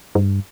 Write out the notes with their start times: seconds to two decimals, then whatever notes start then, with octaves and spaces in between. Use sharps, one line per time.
0.15 G2